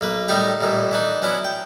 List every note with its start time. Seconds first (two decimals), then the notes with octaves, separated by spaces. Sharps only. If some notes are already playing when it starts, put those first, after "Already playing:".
0.01 B1 A#3 B4
0.28 A2 D#3 G3 D#4 G4 A#5
0.61 A1 A#2 D#3 E3
0.91 E3 D4 D#4
1.22 F#3 B3 C#4 D4 E4
1.45 G5